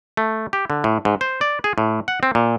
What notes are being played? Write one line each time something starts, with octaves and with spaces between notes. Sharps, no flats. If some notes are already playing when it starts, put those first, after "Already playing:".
A3
G4
D3
A2
G#2
C5
D5
G#4
A2
F#5
C4
A#2